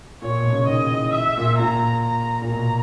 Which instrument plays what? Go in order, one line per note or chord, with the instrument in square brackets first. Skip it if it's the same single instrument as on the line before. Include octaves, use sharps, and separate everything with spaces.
[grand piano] A#2 [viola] C#5
[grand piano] B2
C#3
[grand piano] D#3 [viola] D#5
[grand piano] E3
[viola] E5
[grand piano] A#2
[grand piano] A#2 [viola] A#5
[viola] A#5
[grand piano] A#2
[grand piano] B2 [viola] A#5